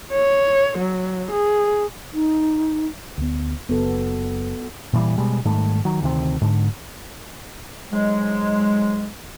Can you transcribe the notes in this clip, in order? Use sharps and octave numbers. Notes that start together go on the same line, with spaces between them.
C#5
F#3
G#4
D#4
D2 B3
F#1 B3 F#4 A4
A#2 E3 G3
B2 G3 G#3
G#2 D#3 G3 A3
D#3 F#3
D2 C3 D#3 C4
G#2 D3
G#2 F#3 G#3